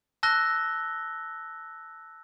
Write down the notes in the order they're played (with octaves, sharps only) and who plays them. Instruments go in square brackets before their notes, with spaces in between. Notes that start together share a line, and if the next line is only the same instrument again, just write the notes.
[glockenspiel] A5 E6 F#6 A#6 G7